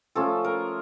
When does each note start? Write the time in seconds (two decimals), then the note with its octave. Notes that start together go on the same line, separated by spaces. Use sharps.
0.15 F3 A3 C#4 A4
0.45 A#4